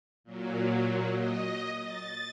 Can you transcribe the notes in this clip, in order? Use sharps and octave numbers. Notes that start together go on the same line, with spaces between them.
A#2 F#3
D#5
A6